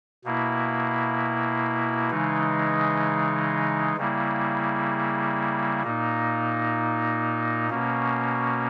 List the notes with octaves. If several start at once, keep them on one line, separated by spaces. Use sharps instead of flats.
B2 A#3 E4
C#3 E3 G#3 D#4
C#3 G3 A#3 E4
A#2 A#3 D#4
B2 A#3 C#4